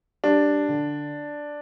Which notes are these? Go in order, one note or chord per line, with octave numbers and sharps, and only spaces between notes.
G3 D4
D3